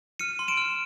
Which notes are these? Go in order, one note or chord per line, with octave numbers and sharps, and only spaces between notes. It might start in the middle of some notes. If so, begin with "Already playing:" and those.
F6 C#7 D#7
C6
D7 E7
F6